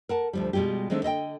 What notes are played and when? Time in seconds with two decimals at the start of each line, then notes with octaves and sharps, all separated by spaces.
0.09 A#4 F#5 A5
0.33 D2 F3 G3
0.53 B2 G3 G#3 F4 G4
0.90 D#3 G#3 A3 C4 D4
1.03 D3 D#5 E5 G5